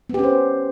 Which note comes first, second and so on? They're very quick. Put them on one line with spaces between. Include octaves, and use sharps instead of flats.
B3 G4 C#4 C5